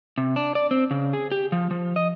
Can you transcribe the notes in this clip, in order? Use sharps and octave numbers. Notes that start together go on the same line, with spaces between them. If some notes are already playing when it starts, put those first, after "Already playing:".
C3
D4
D5
C4
C#3
G#4
G4
F3
F3
D#5